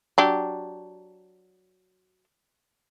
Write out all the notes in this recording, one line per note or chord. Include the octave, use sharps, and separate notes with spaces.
F#3 D4 G4